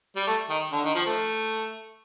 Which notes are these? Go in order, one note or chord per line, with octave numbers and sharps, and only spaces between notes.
G3
A3
D#3
D3
D#3
F3
A3